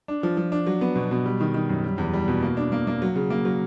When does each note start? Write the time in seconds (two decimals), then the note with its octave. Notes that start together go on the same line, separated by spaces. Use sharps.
0.08 D4
0.23 F3
0.37 F3
0.52 D4
0.66 F#3
0.81 B3
0.96 B2
1.11 B2
1.25 G3
1.41 D#3
1.54 D#3
1.69 F#2
1.84 G3
1.98 E2
2.13 G3
2.28 B2
2.42 A#3
2.57 D4
2.72 A#3
2.87 A#3
3.02 F#3
3.16 C#3
3.30 A#3
3.45 F#3